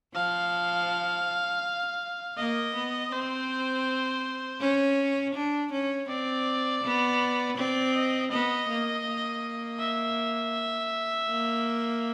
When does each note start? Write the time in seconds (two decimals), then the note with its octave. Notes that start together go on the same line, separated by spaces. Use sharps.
0.15 F3 F5
2.37 A#3 D#5
2.74 B3
3.12 C4 C5
4.60 C#4
5.34 D4
5.71 C#4
6.08 C4 D5
6.83 B3
7.57 C4 D5
7.94 D#5
8.31 B3 D#5
8.68 A#3
9.05 A#3
9.80 E5
11.28 A#3